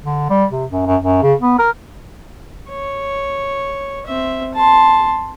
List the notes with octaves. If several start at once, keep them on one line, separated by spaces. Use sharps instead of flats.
D3
G3
C3
F#2
F#2
F#2
C#3
B3
A#4
C#5
C4 E5
A5 C6